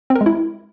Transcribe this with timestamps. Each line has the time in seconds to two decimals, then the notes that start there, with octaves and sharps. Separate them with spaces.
0.10 C4
0.15 A#4
0.21 G#3
0.26 E4